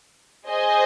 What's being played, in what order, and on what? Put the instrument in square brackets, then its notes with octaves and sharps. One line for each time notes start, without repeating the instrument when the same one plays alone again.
[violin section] G#4 C5 D#5 G#5